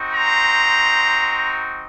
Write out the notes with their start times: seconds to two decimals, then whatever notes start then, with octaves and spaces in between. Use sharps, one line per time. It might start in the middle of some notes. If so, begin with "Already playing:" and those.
Already playing: C4 D#4 F#4
0.14 A#5 C6